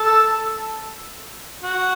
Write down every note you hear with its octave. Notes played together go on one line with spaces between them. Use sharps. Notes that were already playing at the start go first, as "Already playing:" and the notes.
Already playing: A4
F#4